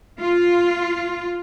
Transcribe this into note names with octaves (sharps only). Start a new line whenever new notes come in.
F4